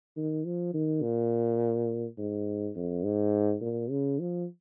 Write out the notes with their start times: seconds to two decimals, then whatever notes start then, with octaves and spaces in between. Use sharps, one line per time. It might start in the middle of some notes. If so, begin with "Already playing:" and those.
0.17 D#3
0.46 F3
0.74 D#3
1.02 A#2
2.18 G#2
2.76 F2
3.04 G#2
3.61 A#2
3.90 C#3
4.19 F3